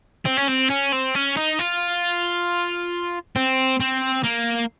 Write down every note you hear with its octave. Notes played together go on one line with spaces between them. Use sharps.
C4
C#4
C4
C#4
C4
C#4
D#4
F4
C4
C4
A#3